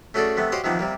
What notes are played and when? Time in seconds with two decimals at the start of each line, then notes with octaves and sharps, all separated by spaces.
0.14 A3 C#4 F#4 G#4 A4 D5
0.37 C3 A3 B3
0.52 F#4 G4 C5 C#5 D#5 F5
0.64 C3 D#3 F3 A#3 B3
0.79 C3 G3 A#3